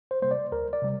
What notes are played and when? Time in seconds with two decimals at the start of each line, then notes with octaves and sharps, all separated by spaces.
0.11 C5
0.22 C3 G3 A#3 C5
0.31 D5
0.52 D2 A#4
0.73 D5
0.82 C3 G3